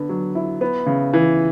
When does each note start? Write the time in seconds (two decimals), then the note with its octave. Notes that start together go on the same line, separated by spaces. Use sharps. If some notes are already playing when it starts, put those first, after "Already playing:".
Already playing: D3 B3
0.09 F#3
0.35 E4
0.61 B3
0.86 C#3
1.13 E3